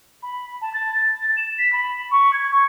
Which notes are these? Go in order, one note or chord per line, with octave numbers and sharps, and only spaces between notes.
B5
A5
A6
A6
E7
B6
B5
C#6
G#6
C#6